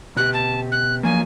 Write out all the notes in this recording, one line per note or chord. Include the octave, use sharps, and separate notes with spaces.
B2 G4 F#6
A5
F#6
F3 F#3 A#3 G#5